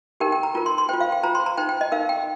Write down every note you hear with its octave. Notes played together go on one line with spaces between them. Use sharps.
D#4 G4 A#4 G5
G5
A#5
F4 A#4 A#5
C6
C6
F4 C5 G5
F5
G5
F4 C5 A#5
C6
A#5
D#4 C5 G5
G5
D#5
D#4 A#4 F5
G5